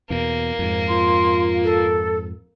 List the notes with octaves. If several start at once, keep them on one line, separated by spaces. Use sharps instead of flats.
E2 B2 A#3
F2 G#2
F4 C6
A4